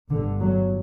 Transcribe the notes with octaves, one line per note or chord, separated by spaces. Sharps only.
G1 G2 D3
F#3